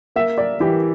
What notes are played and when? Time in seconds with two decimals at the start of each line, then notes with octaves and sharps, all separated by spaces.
0.16 A#3 E5
0.38 A#4 D5
0.60 E3 G4